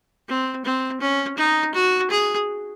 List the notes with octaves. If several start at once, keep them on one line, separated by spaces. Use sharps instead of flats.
C4
C4
C#4
D#4
F#4
G#4